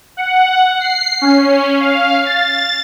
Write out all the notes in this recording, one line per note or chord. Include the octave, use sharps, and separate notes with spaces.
F#5
C7
C#4
F5
A6